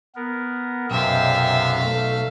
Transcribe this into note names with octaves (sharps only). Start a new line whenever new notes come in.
B3 A#4
B1 F#2 C3 E5 F5 G5
A3